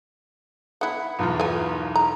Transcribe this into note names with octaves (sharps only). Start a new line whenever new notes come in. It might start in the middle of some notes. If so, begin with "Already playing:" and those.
B3 E4 F#5
B1 E2 F4
A#3 G#5
A#5